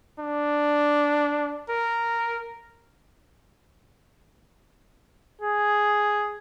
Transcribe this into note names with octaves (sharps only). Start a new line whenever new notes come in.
D4
A#4
G#4